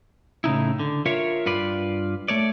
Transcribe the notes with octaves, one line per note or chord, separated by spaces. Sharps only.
A2 C#3 D#4 E4
D3
F4 A#4 C#5 E5 F5
G2 F4 B4 D5
A3 C#5 D5